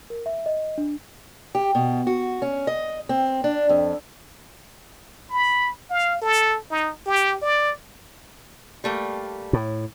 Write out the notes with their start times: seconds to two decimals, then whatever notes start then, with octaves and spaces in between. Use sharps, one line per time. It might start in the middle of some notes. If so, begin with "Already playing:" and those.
0.10 A#4
0.26 E5
0.46 D#5
0.78 D4
1.55 G4
1.75 B2
2.07 F#4
2.42 C#4
2.67 D#5
3.09 C4
3.44 D4
3.69 F2
5.30 B5
5.90 F5
6.22 A4
6.70 D#4
7.06 G4
7.42 D5
8.84 G3 A3 A#3
9.53 A2